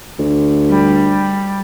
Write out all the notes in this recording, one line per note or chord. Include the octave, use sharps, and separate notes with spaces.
D2
G3